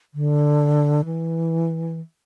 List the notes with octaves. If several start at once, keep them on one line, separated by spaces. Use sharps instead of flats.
D3
E3